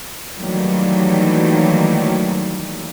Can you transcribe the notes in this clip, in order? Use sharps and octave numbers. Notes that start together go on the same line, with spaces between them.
D#3 E3 F#3 G3 A3 A#3